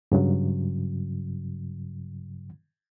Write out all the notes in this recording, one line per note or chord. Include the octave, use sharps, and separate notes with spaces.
G2 C#3 F#3